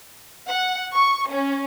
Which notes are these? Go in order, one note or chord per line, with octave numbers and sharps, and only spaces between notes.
F#5
C#6
C#4